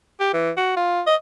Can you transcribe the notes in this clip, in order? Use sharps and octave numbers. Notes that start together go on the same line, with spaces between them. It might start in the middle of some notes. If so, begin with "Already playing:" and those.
G4
E3
F#4
F4
D#5